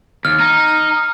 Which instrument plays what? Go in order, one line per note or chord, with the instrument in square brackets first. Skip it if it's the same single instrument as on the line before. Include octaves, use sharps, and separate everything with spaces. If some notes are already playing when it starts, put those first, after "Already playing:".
[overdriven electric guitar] D#2 [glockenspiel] F6
[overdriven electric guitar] D#4